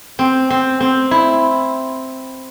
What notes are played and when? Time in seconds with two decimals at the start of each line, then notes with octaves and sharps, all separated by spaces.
0.19 C4
0.50 C4
0.80 C4
1.11 E4